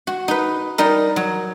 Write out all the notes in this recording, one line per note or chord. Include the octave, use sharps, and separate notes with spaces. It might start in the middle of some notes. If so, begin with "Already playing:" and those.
F#4
D#4 B4
G3 D#4 A#4
F#3